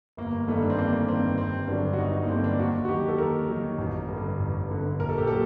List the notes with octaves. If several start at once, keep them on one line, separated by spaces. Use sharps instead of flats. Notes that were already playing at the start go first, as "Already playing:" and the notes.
G1 A#3
G2 D#3 A3
D4
C4
G1 A#3
G2 D#3 C4
G1 C4
G2 D3 F#3 D4
F#4
G1 D#4
D#4
A#3
G2 D3 F#3 C4
D4
D#2 F#4
F#4
D#3 F#3 G4
A4
D#2 A#4
D#3 F#3
A1
G2 D3
A1
G2 D3
A#1 A#4
A4
G4
A#2 F#3 A4